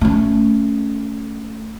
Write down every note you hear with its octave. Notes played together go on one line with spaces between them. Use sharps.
A3 C#4